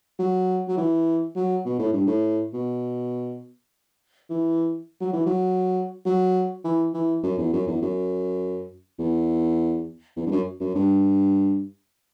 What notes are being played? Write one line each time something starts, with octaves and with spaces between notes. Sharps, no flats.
F#3
F#3
E3
F#3
B2
A2
G2
A2
B2
E3
F#3
E3
F#3
F#3
E3
E3
F#2
E2
F#2
E2
F#2
E2
E2
G2
F#2
F#2
G2